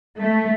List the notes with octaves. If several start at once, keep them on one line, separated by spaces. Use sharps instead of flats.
A3